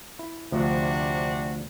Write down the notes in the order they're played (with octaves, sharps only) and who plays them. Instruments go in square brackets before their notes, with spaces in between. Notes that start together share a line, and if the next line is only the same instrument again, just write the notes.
[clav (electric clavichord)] E4
[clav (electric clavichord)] D2 F3 [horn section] C3 D4 F#4